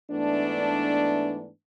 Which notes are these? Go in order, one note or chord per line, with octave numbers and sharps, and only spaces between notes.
G#2 E3 A3 B3 D4